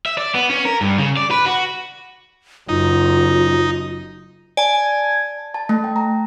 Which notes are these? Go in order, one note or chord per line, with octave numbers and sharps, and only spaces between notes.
E5
D5
B3
C#4
A#4
G2
C#3
D5
B4
F#4
F#1 F#2 D#4 F4
D5 G#5 A5
A5
A3
G5
A#5